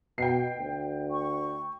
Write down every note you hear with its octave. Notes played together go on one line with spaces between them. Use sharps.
B2 G5 C7
D2
C#6